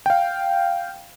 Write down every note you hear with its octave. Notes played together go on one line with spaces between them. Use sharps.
F5 G5